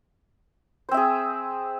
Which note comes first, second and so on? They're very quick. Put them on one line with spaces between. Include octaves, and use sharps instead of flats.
C5 C4 E5 G#4